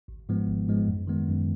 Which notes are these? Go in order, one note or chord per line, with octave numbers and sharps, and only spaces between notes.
G#1
G#2 F3 G#3 B3
G#1
G#2 F3 G#3 B3
F#2
D#3 G#3 B3
F#2